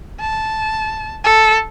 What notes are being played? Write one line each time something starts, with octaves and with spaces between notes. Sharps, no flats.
A5
A4